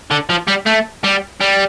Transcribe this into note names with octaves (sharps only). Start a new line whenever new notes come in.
D3
F3
G3
A3
G3
G3